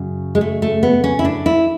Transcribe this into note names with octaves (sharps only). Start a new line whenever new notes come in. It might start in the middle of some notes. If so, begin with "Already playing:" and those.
Already playing: F#2 C#3
G#3
A3
A3
B3
C#4
E4
D4
E4